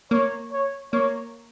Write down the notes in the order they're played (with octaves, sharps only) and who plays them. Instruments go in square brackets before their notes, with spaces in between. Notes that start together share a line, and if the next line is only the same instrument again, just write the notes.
[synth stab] A#3 [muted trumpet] C#5
[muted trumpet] C#5
[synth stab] A#3 [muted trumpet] C#5